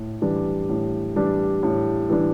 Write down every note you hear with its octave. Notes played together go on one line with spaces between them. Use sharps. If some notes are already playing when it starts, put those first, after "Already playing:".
Already playing: A2
E3 G3 D4
A2
E3 G3 D4
A2
E3 G3 D4